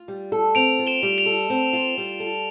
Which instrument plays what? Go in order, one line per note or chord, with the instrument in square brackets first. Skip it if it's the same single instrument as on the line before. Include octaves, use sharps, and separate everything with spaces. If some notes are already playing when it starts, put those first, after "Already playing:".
Already playing: [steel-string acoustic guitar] F4
G3
A4
[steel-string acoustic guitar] C4 [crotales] D7 F7
[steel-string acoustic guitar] F4
[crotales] E7 G7
[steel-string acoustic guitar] G3
[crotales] D7 F7
[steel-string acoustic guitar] A4
C4
F4
G3
A4